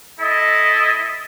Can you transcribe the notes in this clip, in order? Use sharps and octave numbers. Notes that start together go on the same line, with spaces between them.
E4 A4 D#5